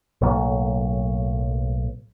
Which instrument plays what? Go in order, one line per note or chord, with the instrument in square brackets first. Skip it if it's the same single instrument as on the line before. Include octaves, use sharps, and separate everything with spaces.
[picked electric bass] B1 A2 F#3 A#3